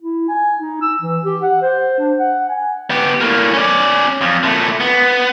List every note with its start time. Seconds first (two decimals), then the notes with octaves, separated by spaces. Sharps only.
0.02 E4
0.28 G#5
0.59 D#4
0.82 E6
1.01 E3
1.24 G4
1.43 F#5
1.61 C5
1.99 D4
2.19 F#5
2.49 G#5
2.90 B3 G4
3.21 A2 A#3
3.54 C#4 D5
4.21 F2
4.43 A#2 A3
4.80 B3